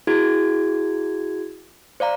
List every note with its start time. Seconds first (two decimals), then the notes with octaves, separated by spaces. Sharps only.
0.07 E4 F#4 G#4 G#6
2.00 C5 D5 F5 A#5